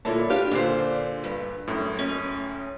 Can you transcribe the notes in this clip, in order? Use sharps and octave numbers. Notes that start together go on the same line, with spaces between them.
G2 A#2 D3 E4 C#5 A5
D4 G4 B4 F5
A#2 D3 D4 C5 C7
G2
F#2 A2
C#4 G#5